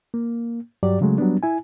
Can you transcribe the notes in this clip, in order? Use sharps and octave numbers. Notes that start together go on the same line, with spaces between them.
A#3
G2 F#3 G4 D5
C#3 F#3 G#3 A3
F#3 G3 B3 D4
E4 G#5